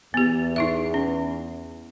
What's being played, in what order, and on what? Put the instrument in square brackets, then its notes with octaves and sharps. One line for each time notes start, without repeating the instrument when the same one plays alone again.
[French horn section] E2 [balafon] B3 G4
[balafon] D#4 E4 E5
C#4